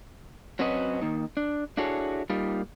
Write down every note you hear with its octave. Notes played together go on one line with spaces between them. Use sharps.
F#3 C4 C#4 F#4 B4 D#5
D#3 A#3 D#4
D4
D4 E4 F#4 G#4 A4 C#5
G3 A#3 D#4 F4 G4